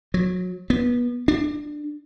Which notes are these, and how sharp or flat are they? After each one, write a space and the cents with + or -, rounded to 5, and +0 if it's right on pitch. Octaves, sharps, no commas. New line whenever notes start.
F#3 -25
B3 -25
D4 +15